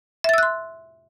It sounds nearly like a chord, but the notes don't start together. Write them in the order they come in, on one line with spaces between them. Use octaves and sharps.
E5 A6 E6 F#6 C6